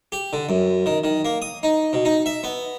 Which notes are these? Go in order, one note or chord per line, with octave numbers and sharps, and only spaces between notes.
G4
D3
F#2
D#3
D#3
A#3
D#6
D#4
B2
D#4
E5
B3